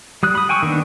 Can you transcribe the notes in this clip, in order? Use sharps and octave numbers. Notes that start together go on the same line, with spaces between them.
G3 D#6 F#6
B5 D#6
G5 G#5 C#6 E6
D#3 A#3 B3 D4